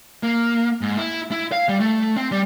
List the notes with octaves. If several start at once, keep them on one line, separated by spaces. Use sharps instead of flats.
A#3
G#2
E4
E4
F5
G3
A3
C4
G3